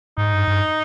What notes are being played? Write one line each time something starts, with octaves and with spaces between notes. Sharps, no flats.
G#2 D#4
G2
G2